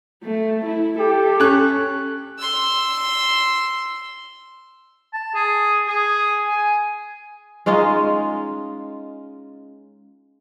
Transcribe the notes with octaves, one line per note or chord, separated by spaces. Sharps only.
A3
E4
G4 A4
C#4 F#6
C6 E6
A5
G#4
G#4
G#5
G#3 C#4 D#4 F4